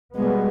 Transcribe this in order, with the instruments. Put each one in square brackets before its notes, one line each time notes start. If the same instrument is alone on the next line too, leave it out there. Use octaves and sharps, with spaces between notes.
[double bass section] B2 G3 B3 [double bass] G#3